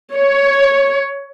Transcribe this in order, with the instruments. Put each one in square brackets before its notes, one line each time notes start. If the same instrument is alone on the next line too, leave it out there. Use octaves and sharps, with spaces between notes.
[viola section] C#5